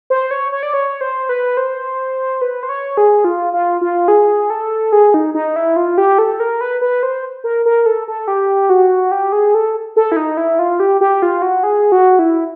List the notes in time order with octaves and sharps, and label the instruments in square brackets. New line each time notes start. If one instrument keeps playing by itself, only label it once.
[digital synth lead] C5
C#5
C#5
D5
C#5
C5
B4
C5
B4
C5
C#5
G#4
F4
F4
F4
G#4
A4
G#4
D#4
D#4
E4
F4
G4
A4
A#4
B4
B4
C5
A#4
A#4
A4
A4
G4
F#4
G4
G#4
A4
A4
E4
D#4
E4
F4
G4
G4
F4
F#4
G#4
F#4
E4